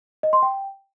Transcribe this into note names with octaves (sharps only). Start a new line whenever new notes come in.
D#5
C6
G5